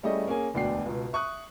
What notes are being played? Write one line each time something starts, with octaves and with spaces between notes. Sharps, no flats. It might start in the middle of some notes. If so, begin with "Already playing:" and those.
G3 A3 C#4 E4 G#4 D#5
A#3 C#4 G#4 G#5
E1 D2 B2 D4 G5 C7
C#2 B2
E5 C#6 D#6 F#6